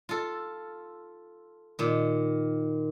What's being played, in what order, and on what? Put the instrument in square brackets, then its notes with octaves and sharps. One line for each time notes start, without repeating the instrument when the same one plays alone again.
[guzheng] F4 A4
A#2 D#3